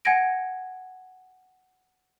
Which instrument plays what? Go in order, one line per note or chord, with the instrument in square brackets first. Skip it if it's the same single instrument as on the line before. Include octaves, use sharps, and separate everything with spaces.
[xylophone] F#5 G#5 G#6 A#6 D7